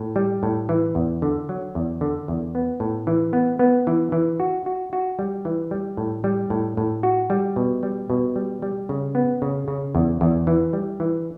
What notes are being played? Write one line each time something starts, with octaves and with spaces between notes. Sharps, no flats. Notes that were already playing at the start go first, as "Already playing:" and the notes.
Already playing: A2
G3
A2
E3
E2
D3
F#3
E2
D3
E2
B3
A2
E3
B3
B3
E3
E3
F#4
F#4
F#4
G3
E3
G3
A2
G3
A2
A2
F#4
G3
B2
G3
B2
G3
G3
C#3
B3
C#3
C#3
E2
E2
E3
G3
E3